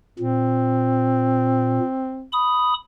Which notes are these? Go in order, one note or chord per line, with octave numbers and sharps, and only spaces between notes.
A#2 C4
B5 D#6